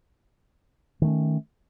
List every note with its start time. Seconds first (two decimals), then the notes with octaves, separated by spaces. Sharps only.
1.02 D#3
1.04 A3
1.07 C#4